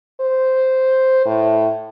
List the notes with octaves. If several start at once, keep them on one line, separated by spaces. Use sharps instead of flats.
C5
A2